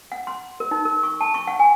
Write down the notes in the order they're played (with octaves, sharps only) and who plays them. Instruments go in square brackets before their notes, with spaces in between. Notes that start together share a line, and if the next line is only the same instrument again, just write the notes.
[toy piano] F#5
C6
A#4
D#4
A#4
C#6
A5
C#6
F#5
G#5